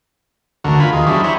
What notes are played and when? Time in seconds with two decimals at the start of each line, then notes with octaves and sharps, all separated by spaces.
0.64 D2 D3 F#4 A#4
0.80 F4 A#4 G#5 B5
0.92 D#2 D#3 F4 G#4
1.06 F#3 C#4 D4 E4 G4 G#4
1.24 C5 E5 G#5 A#5 B5 C#6